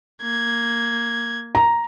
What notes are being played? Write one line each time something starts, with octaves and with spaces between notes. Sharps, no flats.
A#3 G#6
A#5